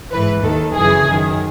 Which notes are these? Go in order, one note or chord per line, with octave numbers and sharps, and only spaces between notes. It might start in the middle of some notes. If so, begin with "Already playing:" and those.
G#2 E3 B4
D#2 D#3 A4
F#2 C#3 E3 G#4
F#2 D#3